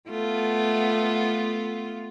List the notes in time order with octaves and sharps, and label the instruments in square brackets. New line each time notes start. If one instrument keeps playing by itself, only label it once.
[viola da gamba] A3 B3 F4